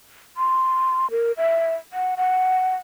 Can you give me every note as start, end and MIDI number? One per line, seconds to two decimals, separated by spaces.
0.37 1.10 84
1.11 1.32 70
1.37 1.74 76
1.93 2.15 78
2.17 2.75 78